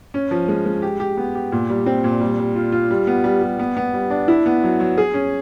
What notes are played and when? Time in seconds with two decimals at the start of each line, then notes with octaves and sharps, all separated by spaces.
0.14 C#4
0.31 F3
0.48 G#3
0.66 G#3
0.82 G4
1.00 G4
1.17 B3
1.35 G4
1.52 A#2
1.69 G3
1.86 C4
2.04 A#2
2.21 G3
2.39 G3
2.56 F4
2.72 F4
2.91 G3
3.07 B3
3.24 G3
3.41 G3
3.59 B3
3.77 B3
3.94 G3
4.10 D4
4.28 E4
4.46 B3
4.63 F#3
4.80 F#3
4.98 G#4
5.14 C#4